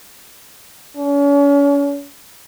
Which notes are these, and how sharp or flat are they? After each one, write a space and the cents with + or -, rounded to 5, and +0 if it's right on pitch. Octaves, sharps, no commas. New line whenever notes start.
C#4 +40